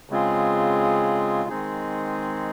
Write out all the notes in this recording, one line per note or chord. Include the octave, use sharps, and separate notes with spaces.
C#3 G#3 C4 F4 G#4
D#3 G#3 C4 D#4 G#4